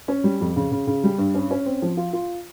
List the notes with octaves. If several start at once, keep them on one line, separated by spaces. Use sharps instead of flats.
C#4
G3
F2
C#3
C#3
C#3
G3
G2
C#4
C#4
C4
F3
F4
F4